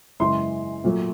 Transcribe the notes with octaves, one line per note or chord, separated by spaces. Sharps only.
F#2 C#3 E3 G#3 C6
A#2 F#3 A3